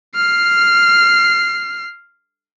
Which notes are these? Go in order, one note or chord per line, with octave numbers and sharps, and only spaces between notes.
F6 C7